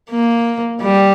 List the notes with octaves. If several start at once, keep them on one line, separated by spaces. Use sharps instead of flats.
A#3
G3